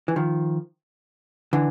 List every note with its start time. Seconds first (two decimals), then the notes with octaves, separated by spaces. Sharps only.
0.08 E3
0.16 D#3 F3
1.53 D3 E3